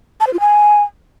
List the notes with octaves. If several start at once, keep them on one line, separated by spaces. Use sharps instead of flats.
A5
C5
F4
G#5